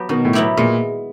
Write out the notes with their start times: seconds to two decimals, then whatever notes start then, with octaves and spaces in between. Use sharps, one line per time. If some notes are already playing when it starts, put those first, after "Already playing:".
Already playing: F#3 B3 G4
0.09 B2 D#3
0.25 A2
0.33 F#3 B3 E4 G4
0.57 A#2 G#3